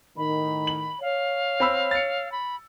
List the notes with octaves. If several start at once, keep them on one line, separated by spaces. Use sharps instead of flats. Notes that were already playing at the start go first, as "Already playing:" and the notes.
A2 D#3 B5
F#7
C#5 F5
C4 B5 E6
A6 C#7
B5